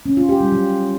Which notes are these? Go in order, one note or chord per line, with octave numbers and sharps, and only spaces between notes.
C#4
F4
G4
G3
F#3